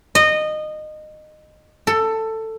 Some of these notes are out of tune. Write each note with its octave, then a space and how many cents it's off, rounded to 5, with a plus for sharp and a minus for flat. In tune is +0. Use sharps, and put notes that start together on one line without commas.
D#5 -20
A4 +15